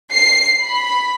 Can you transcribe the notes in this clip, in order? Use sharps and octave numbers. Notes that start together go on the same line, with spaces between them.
C7
B5